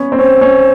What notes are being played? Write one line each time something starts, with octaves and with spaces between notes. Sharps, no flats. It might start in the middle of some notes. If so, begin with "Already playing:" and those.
Already playing: B3 C#4
C4
C#4 C5
C#4